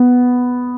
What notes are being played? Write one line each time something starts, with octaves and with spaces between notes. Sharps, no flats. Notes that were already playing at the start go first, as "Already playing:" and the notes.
Already playing: B3